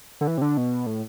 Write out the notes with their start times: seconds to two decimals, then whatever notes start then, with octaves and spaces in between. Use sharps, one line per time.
0.21 D3
0.27 E3
0.38 C3
0.42 D3
0.57 B2
0.86 A2